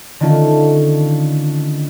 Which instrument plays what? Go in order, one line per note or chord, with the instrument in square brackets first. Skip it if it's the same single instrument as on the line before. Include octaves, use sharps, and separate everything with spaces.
[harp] D3 D#3 A3 C#4 F4 A4